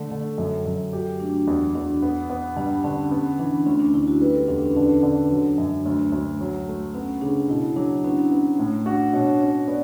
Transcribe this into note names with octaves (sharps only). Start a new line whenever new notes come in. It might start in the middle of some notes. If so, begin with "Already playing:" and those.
Already playing: D3 A3
D3 A4
F#2
F#2
F#4 G4
A3 D4
E2
E2 D4
B3
B3
G2 D4
D3 C#4
B3 C#4
E3 D4
D2 C#4
D4
D3 E4
F#4
G3 B4
A4
E2 D4
C#4
D3 D4
D3
F#3
F#2
D2
D2
F#3
A3
B3 C#4
C#3 D4
B2 E4
F#3 D4
B3 C#4
B3 D4
A2
D4 F#4
B2 C#5
C#4 C#5
B3 D5